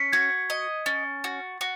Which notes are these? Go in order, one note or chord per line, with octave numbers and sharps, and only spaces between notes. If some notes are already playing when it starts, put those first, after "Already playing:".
Already playing: C#4 B6 C#7
F#4 G#6
D#5
C#4 A6
F#4
F#4